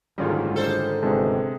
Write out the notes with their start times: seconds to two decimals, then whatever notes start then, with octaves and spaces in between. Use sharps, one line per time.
0.18 F#1 G#2 D3 D#3 G3 C#4 F4
0.56 A4 C5
1.03 G1 C3 G#3 A5